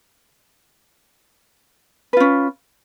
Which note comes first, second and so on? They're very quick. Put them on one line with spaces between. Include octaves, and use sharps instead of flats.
B4 F4 C#4